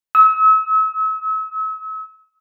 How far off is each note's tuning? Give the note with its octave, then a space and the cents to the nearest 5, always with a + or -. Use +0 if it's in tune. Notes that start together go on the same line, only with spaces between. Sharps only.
E6 -40